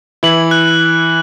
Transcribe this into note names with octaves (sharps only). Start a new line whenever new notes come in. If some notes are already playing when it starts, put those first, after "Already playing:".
E3 E4 F#7
F#6